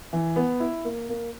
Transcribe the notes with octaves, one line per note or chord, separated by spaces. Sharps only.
E3
B3
E4
A#3
A#3